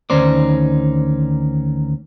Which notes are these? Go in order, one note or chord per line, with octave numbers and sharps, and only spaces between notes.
D2 D#3 C#4 D#4 C5 D5